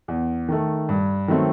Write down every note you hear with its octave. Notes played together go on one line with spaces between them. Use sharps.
E2
D#3 A3
G2
D#3 F#3 A3 C4